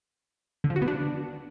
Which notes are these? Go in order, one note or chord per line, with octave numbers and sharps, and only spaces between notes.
D3
F3
F#4
B3
D4